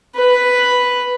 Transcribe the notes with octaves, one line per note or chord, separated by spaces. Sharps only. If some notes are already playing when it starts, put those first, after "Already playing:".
B4